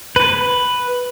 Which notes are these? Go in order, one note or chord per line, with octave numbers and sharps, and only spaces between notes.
B4